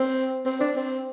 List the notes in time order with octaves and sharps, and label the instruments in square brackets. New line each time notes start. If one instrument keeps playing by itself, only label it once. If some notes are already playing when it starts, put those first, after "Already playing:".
Already playing: [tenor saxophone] C4
C4
D4
C4